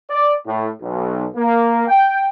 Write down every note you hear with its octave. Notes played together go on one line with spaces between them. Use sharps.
D5
A2
B1
A#3
G5